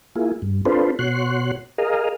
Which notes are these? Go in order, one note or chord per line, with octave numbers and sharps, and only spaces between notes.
A#3 E4 F4 G#4
G2
C4 D4 F4 A4 B4 C5
B2 F#4 C#5 C6 F#6
G#4 A#4 D#5 F5